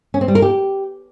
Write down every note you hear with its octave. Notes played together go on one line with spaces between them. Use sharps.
C#4
C4
G3
A#4
G4